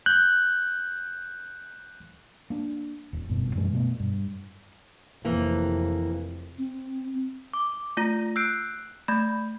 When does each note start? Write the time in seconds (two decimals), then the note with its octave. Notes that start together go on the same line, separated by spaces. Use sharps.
0.06 F#6 G6
2.50 A#3 D4
3.13 D#1
3.28 F#1 G2 B2
3.55 F#2 E3 G3 G#3
3.73 B2 A3 B3
4.00 G2
5.25 F1 F2 E3 A#3
6.58 C4
7.54 D6
7.97 A3 F4 A#5 A#6
8.36 E6 F#6 G6 C7 D7
9.08 A3 B5 G6 G#6